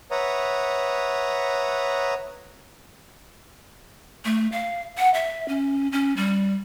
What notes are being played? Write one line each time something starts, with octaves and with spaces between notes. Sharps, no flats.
B4 C#5 E5 F#5 A#5 D#6
A3
F5
F#5
E5
C#4
C#4
G3